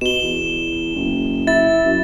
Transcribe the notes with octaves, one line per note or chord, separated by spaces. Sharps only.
B2 E7 G7
E2
F#1
E4 A6
F#2